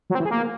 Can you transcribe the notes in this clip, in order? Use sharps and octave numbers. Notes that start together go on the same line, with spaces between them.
F#3
C4
E3
G#4
A#3